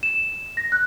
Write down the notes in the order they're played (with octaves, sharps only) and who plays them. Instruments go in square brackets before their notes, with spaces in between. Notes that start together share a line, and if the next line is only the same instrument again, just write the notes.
[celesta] E7
A#6
F#6